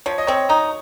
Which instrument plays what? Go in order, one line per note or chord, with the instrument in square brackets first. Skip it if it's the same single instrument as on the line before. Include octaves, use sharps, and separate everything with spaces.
[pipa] F3 [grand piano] C#5
[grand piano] D#5
[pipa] C4 [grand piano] C#5
[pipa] D#4 [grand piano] A#5